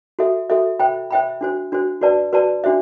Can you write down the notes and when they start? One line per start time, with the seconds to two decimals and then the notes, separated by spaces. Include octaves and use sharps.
0.19 F#4 A4 E5
0.50 F#4 A4 E5
0.79 C5 E5 G5 B5
1.10 C5 E5 G5 B5
1.41 D4 F#4 C5
1.72 D4 F#4 C5
2.01 F#4 B4 D5 A5
2.33 F#4 B4 D5 A5
2.64 D4 F#4 C5 E5